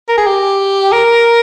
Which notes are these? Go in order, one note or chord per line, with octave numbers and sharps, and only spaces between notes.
A#4
G#4
G4
A#4